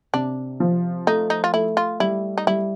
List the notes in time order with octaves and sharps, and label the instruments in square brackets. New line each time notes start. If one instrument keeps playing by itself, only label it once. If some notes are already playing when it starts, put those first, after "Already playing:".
[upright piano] C3 [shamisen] D4
[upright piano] F3
[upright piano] A3 [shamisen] D#4
[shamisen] D#4
F4
[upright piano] A3 [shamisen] E4
[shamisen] F4
[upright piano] G3 [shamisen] E4
[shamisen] D#4
[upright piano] G3 [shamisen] E4